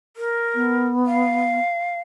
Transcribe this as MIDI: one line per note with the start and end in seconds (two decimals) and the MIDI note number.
0.17 0.88 70
0.54 1.59 59
1.06 2.00 77